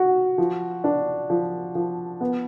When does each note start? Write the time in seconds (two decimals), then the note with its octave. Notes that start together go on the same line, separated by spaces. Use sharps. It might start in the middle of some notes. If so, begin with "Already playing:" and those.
Already playing: F#4
0.38 F3
0.84 D4
1.30 F3
1.75 F3
2.21 B3